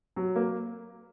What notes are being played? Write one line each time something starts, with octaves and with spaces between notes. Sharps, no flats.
F#3
A#3